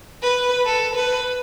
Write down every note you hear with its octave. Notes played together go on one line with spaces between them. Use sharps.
B4
A4
B4